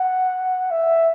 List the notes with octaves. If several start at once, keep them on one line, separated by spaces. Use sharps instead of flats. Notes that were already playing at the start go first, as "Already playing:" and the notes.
Already playing: F#5
E5